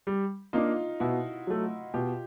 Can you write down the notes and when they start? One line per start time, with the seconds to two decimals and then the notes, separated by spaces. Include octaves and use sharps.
0.07 G3
0.53 A#3 D4 D#4 F4
1.00 B2 E4 F#4
1.47 F#3 A3
1.94 B2 F4 G4